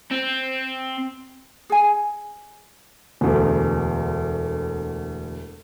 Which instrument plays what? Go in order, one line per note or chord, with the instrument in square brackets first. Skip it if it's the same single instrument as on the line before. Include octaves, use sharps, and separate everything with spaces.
[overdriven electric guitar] C4
[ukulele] G#4 G#5
[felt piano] E1 D2